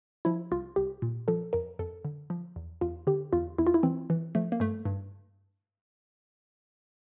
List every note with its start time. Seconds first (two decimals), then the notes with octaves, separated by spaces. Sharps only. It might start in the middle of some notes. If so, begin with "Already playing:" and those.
0.25 F3 E4
0.51 C2 F4
0.76 C2 G4
1.02 A#2
1.28 F3 A4
1.53 F2 A#4
1.79 F2 A4
2.05 D3
2.30 F3
2.56 E2
2.81 E2 F4
3.07 D3 G4
3.33 E2 F4
3.58 E2 E4
3.67 F4
3.74 E4
3.83 E3 C4
4.10 E3
4.35 F3 A3
4.52 A#3
4.60 G2 A3
4.86 G2